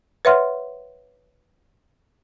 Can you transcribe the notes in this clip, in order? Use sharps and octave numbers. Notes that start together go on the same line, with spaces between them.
B4 C#5 E5 F#5 C6 F6